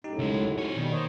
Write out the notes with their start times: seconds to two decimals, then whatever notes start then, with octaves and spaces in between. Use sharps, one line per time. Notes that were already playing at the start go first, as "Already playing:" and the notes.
0.04 F#2 A2 D#4 G4
0.19 C#2 G#3
0.58 C4 C#5
0.77 B2 D3 D#3 G3
0.92 A#3 C5 C#5 D#5